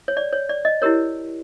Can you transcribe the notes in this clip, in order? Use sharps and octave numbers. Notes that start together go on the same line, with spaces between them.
C#5
D5
C#5
D5
D#5
E4 G4 A#4 C#5